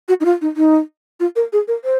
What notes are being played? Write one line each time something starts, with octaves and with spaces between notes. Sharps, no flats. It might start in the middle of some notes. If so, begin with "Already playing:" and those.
F#4
D#4
F4
D#4
D#4
F4
A#4
G#4
A#4
C5